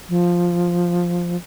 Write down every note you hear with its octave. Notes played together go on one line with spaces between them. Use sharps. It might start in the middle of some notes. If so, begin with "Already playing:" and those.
F3